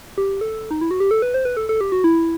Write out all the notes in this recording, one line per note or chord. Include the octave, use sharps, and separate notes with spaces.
G4
A4
D#4
E4
F#4
G4
A4
B4
C5
B4
A4
A4
G4
F#4
E4